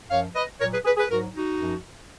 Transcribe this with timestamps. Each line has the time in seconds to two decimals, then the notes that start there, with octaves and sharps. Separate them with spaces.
0.10 F#2 F3 C#5 F5
0.35 B4 D#5
0.60 A#2 A#4 C#5
0.65 F#3
0.73 G#4 B4
0.85 G#4 B4
0.97 G#4 B4
1.10 G#2 F#3 F#4 A#4
1.35 D#4 F#4
1.60 F#2 F3